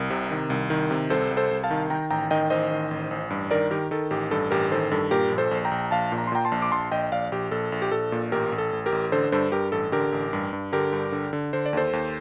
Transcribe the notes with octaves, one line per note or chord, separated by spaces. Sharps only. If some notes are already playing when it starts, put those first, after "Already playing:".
Already playing: C2 A#4
C3
D#3
C2
D#3
C3
C2 A4 C5
C2
A4 C5
C2
F5 A5
D#3
D#3 G5 A#5
A1 G5 A#5
D#3 D#5 G5
A1 C5 D#5
D#3
A1
A1
G2
D#3 A#4 D5
D#3 G4 A#4
D#3 A4
A1 G4
G2 A4
A1 G4 A#4
D#3 A4 C5
G2 A4
A#2 G4 A#4
A#1
A4 C5
A#1
G5 A#5
A#1
A#1 F5 A5
A#2
A#5
C6
A#2 G5 A#5
A5 C6
A#1
D6
A#1 A5 C6
A#1 D#5 G5
A#1 D5 F5
A#1 G4
A#1 A4
A#1
G4
A#1 A4
A#2
A1 G4 A#4
A1
A4
A1
G4 A#4
A1
D3 A4 C5
G2 A4 C5
G2 G4 A#4
A1 A4
D3 G4 A#4
A1
G2
G2
D3 G4 A#4
G2
D3
D3
D3 C5
D5
D#2 A4 C5
D#2